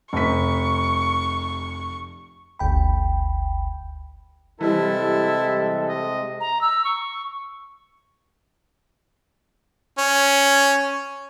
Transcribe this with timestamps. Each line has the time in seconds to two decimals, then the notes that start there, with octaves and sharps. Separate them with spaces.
0.13 F1 C#6 B6
2.59 G1 D2 G5 B5
4.61 C3 E3 G3 G#3 E4 A4
5.89 D#5
6.40 A#5
6.61 E6
6.85 C#6
9.98 C#4